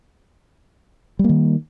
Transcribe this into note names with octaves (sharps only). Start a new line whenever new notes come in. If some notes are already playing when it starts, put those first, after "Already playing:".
D#3 G3 A#3